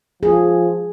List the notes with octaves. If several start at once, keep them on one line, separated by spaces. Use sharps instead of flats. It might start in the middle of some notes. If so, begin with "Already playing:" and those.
F3 G#4